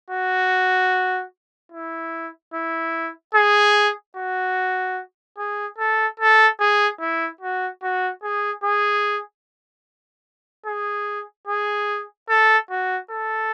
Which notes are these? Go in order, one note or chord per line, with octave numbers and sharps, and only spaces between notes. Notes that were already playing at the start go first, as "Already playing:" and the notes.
F#4
E4
E4
G#4
F#4
G#4
A4
A4
G#4
E4
F#4
F#4
G#4
G#4
G#4
G#4
A4
F#4
A4